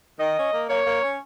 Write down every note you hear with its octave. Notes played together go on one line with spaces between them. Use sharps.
D#3 D#5
C#4
A#3
A#3 C#5
A#3
C#4